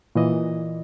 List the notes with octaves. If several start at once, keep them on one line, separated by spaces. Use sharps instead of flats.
A#2 E3 D#5